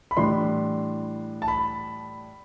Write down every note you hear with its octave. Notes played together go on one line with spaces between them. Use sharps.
B5
A2 E3 G3 D4 C6
A5
B5